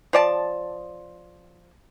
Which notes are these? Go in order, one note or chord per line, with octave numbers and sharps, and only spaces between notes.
F3 D5 A5